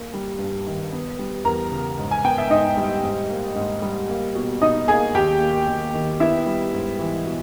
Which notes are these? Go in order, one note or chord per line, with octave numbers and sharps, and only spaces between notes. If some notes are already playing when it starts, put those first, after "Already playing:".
Already playing: A#3
G3
G2
D#3
B3
G3
E2 A#4 A#5
C#3
G#2
G#5
B3 G5
E5
G#2 D#4 D#5
G3
G#2
A#3
G#2
G3
A#3
B2
B2 D#4 D#5
A#3 G#4 G#5
D#2 G4 G5
A#3
D#2
D#3
B3 E4 E5
G3
G#2
E3
B2